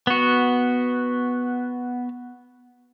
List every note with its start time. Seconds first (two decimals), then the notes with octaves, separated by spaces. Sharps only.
0.07 B3 F#4